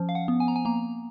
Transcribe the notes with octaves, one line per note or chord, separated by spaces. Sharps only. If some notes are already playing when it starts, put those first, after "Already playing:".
Already playing: F3 C#4
F5
F#5
B3
G#5
A#5
G#5
A#3 A#5